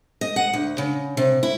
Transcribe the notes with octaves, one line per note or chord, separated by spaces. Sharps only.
D#5
F#5
D2
C#3
C3
E4